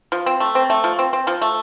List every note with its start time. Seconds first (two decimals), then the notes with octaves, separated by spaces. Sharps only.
0.12 F3
0.26 C4
0.40 A3
0.55 C4
0.70 A3
0.84 F3
0.99 C4
1.13 C4
1.27 F3
1.42 A3